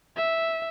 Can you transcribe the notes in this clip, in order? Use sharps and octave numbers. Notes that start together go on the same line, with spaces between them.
E5